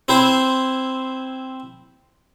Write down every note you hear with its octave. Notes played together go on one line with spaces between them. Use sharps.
C4 E4 C5